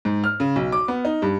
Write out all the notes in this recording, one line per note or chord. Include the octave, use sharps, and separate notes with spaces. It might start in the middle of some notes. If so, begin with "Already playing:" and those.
G#2
F6
C#3
B1
D6
B3
D#4
G2